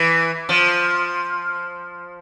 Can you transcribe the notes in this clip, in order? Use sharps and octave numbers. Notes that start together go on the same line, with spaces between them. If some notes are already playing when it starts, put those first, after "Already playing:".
Already playing: E3
F3